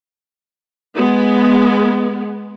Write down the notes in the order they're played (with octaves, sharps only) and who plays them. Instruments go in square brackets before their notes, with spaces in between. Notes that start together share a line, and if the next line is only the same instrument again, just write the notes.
[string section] G#3 B3